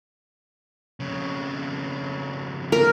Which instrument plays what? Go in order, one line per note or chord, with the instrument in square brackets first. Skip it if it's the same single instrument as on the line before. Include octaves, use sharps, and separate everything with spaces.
[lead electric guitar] F2 C#3
[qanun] A#4